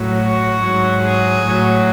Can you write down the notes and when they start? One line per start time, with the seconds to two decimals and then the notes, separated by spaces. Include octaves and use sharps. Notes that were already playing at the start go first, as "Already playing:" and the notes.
Already playing: A2 F#3
0.21 F#4
0.62 G#2 F#3
1.02 G#4
1.43 A2 F#3